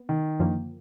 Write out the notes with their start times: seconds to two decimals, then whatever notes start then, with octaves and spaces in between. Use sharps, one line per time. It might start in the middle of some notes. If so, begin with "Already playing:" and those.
Already playing: B3
0.09 D#3
0.39 F#2 D3 F3 A#3